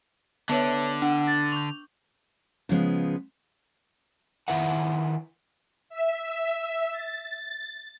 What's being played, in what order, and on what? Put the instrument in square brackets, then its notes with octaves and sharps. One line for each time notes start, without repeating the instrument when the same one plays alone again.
[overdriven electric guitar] D3 [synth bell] B3 B4 E5 [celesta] C#5 A5
[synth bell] D4 [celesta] F#5
[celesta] A6
[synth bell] C#6 D6 G6 [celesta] F7
[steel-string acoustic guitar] C#3 F3 G#3 B3
[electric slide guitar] D#3 A3 E4 B4 E5 F#5
[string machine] E5
A6